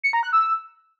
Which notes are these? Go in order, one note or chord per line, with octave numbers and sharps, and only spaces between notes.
C#7
A#5
F#6
E6